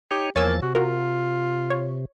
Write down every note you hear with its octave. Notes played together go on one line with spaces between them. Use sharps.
D#4 G4 C#5
E2 F3 A#3 C#5 G#5 E6 A6
C3 F#4
F4 F#4 A#4
C#5